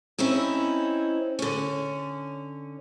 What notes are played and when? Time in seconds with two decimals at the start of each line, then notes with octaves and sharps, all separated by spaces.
0.19 C4 C#4 D#4 E4
1.39 D3 C#4